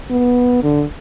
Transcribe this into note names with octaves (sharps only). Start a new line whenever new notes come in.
B3
D3